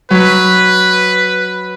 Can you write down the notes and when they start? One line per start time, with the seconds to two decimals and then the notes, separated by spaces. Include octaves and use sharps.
0.10 F#3 B4